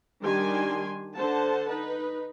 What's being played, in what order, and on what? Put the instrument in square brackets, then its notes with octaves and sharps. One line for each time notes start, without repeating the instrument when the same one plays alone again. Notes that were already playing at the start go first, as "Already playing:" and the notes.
[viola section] D#3 G3 D4 G4 G#5 C6
D3 C5 F#5 A5
D#4 B4